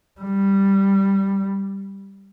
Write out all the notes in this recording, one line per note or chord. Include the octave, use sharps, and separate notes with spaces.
G3